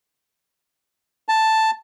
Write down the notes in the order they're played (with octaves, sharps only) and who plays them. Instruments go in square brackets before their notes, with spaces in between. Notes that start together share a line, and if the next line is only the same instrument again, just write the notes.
[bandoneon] A5